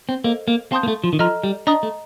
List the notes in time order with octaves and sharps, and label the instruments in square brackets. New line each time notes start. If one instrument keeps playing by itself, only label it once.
[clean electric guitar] C4
[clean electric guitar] A#3 [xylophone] A4 C5 D#5
[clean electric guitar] A#3
[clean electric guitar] C4 [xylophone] F5 A5 C6 D#6 G6
[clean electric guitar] A#3
A3
F3
D#3
[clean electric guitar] F3 [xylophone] A4 D#5 A#5 F6
[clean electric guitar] G3
[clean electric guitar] D4 [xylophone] D#5 A#5 D#6
[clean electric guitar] A3